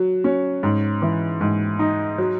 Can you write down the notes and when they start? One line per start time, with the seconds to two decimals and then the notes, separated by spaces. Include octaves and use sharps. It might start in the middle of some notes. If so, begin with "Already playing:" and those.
Already playing: F#3
0.24 C#4
0.63 G#2
1.02 E3
1.41 G#2
1.79 D#4
2.18 F#3